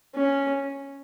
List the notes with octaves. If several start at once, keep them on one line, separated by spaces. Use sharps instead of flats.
C#4